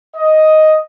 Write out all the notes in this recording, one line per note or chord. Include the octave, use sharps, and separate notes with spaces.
D#5